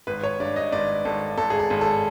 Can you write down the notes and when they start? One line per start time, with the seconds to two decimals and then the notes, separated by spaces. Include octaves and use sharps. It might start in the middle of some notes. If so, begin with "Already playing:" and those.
0.07 G#1 B4
0.23 C#5
0.40 G2 D5
0.56 D#5
0.72 G#1 D5
1.05 G#1 A4
1.37 G#1 A4
1.50 G#4
1.59 A4
1.70 G#1
1.81 A4